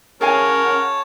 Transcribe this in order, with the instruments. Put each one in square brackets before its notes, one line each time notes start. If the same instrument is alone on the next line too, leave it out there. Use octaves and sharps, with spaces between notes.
[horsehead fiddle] C#4 F#5 [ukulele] G#4 F5 G#5 [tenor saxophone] A#4 [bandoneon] C#5 A5